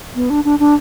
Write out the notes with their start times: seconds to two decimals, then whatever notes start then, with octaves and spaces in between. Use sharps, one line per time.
0.15 B3
0.30 D4
0.45 D4
0.59 D4